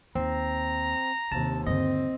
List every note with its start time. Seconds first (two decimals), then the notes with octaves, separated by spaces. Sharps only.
0.15 D#2 C4 A#5
1.32 D#2 C3 D4 A5
1.67 G2 D3 C4 D#5